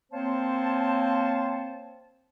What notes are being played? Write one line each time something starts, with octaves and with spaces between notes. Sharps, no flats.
A#3 C4 C5 C#5 F5 A5